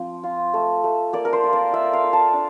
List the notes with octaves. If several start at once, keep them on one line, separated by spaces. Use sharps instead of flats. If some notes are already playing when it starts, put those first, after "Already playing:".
Already playing: F3 C4
F4
A3
A3
A#3 D5
A#4
C5
F4
D5
F4 E5
F5
F4
A5
D4